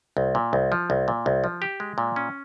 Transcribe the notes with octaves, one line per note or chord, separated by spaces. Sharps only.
C2
A#2
C2
F3
C2
A#2
C2
F3
G4
G#3
A#2
C#4